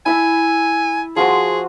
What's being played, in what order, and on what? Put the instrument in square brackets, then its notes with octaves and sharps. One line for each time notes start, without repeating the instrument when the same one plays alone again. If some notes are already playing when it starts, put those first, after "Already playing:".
[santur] E4 E5 A5 [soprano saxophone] G#5
[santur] F3 F#4 C5 [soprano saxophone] G#4